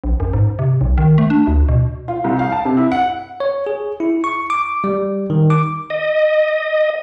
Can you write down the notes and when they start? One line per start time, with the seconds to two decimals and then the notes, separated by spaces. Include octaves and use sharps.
0.04 A#1
0.20 F#2
0.33 G#2
0.59 C3
0.81 B1
0.98 D#3
1.18 A3
1.30 D4
1.47 D2
1.69 B2
2.08 F4
2.24 C2
2.39 F5
2.52 A5
2.65 C3
2.77 E4
2.92 F#5
3.40 C#5
3.67 G#4
4.00 E4
4.24 C#6
4.50 D6
4.84 G3
5.30 D#3
5.50 D6
5.90 D#5